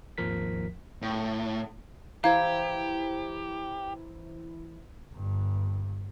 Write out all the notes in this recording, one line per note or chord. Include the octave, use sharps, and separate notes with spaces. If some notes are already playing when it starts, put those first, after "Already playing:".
G#1 D#2 F3 A#4 B6
A2
E3 E4 G4 C5 F5 A#5 G#6
G1 G2